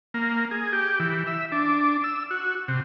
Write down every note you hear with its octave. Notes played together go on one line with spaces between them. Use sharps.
A#3
G#4
G4
E3
E5
D4
E6
F#4
C3